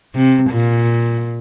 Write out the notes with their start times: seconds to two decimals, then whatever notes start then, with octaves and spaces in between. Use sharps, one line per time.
0.15 C3
0.51 A#2